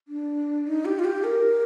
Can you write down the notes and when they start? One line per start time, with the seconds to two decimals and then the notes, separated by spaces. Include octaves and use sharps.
0.08 D4
0.67 D#4
0.85 G4
0.99 F4
1.05 G4
1.24 A#4